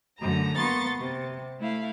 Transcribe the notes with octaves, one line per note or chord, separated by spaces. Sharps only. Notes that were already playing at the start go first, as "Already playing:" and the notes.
F#2 D3 A3 A#5
A#3 B3 C6 C#6 A6
C3
A3 E4 F5